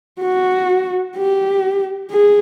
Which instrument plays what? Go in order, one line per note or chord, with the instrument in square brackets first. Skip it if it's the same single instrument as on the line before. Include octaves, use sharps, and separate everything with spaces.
[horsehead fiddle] F#4
G4
G#4